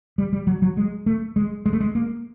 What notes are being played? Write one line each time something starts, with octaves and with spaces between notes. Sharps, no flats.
G3
G3
F#3
F#3
G#3
A3
G#3
G#3
A3
G#3
A#3